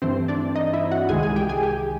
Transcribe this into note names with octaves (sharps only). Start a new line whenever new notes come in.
G2 E3 A3 C4 C5
D4 D5
D#4 D#5
E4 E5
F#4 F#5
C2 C3 D#3 G#3 G#4 G#5
G#4 G#5
G4 G5
G#4 G#5
G4 G5